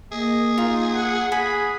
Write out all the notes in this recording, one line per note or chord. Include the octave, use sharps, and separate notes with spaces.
A#3 G#4 D#5
D#4 F4
F#5
G#4 G#5 B5